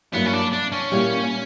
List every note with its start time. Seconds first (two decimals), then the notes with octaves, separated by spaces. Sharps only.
0.13 G2 F#3 A#3 B3 E4
0.26 C#4
0.33 D4
0.53 D4
0.72 C#4
0.92 A#2 G3 A#3 E4